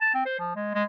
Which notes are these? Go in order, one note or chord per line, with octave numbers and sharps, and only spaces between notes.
A5
C4
C5
F3
G#3
G#3